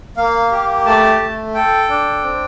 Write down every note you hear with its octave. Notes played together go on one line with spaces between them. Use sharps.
A#3 F5
G4
A3 A5
A3
A4 G5
D4
C4